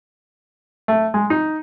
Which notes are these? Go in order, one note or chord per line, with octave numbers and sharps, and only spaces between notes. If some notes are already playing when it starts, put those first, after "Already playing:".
A3
G#3
D#4